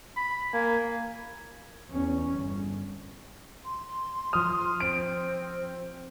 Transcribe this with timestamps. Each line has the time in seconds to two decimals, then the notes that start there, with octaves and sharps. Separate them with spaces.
0.16 B5
0.54 A#3 G#5
1.90 E2 C#4
2.34 G1
3.65 C6
4.33 F3 D#6 F6
4.80 C4 D7